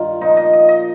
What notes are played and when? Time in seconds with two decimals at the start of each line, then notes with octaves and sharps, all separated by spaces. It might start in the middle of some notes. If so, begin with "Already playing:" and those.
Already playing: G2 D#3 F4
0.21 A#2 F3 D#4
0.37 D#5
0.53 D#5
0.69 D#5